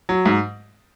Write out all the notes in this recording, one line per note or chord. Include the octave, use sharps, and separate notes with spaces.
F#3
G#2